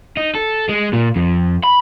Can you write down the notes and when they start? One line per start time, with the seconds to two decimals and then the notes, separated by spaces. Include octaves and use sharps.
0.17 D#4
0.35 A4
0.69 G#3
0.93 A#2
1.16 F2
1.64 B5